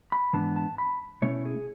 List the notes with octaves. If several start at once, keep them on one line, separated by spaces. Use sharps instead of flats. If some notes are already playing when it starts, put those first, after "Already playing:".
B5
G#2 E3 B3 D4 A5
A5
B5
B2 A3 C#4 E4 C#5
G#4